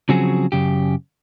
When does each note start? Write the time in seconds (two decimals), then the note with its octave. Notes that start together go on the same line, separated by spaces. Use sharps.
0.09 C#3 F3 F#3 C4 F#4 G#4
0.52 F#2 C#3 G4